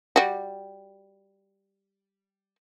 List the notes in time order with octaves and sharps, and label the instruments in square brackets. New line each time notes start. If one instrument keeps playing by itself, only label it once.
[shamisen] G3 F#4